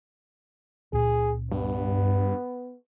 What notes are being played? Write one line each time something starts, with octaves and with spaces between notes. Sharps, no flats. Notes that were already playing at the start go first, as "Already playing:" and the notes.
C#2 A#2 C#3 G#4
G2 B3